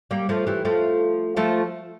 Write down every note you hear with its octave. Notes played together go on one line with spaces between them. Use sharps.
G3 A#3
F3 A3
E3 G3
F3 A3
F3 A3